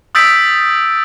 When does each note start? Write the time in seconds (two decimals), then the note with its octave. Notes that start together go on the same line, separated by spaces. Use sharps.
0.15 D#6 E6 G6 A6 B6 D7